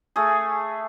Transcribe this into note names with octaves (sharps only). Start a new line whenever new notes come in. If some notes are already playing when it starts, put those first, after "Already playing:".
A3 G#4